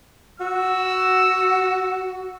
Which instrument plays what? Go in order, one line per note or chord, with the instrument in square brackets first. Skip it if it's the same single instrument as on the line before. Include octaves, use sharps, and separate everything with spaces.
[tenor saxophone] F#4 [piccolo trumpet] E6